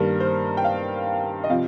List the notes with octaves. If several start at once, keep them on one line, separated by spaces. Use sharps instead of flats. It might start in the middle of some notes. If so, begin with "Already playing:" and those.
Already playing: G2 D#3 G3 A#3 A#4
C5
G5
F5
D#5
C3 F3 F5